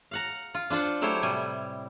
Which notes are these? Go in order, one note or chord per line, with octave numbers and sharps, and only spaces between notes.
F5 F#5 A#5
F4
D4 F4 C5 F#5
F#3 A3 E4 G4 C5 C#5
A2 C3 G3 G#5